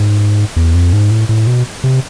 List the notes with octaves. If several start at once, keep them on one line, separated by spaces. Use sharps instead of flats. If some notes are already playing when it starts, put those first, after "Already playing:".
Already playing: G#2
E2
F2
G#2
A2
A2
B2
C3